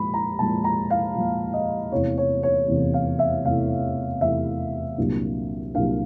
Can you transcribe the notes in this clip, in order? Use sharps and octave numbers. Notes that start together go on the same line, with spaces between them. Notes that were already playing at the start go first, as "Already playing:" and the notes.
Already playing: A#2 F3 G#3 B5
A#5
A#2 F3 G#3 A5
A#5
F5
A#2 F3 G#3
D#5
E2 C3 E3 A3 C#5
C#5
C#5
E2 C3 E3 A3
F5
E5
E2 C3 E3 A3 F5
E2 C3 E3 A3 E5
C2 A#2 F#3 A#3 D4
C2 A#2 F#3 A#3 D4 F5